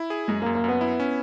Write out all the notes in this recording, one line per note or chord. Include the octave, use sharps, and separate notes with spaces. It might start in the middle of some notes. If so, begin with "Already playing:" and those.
Already playing: E4
G#4
F#2 G#3
A#3
F#2
A#3
F#2 B3
E4
C#4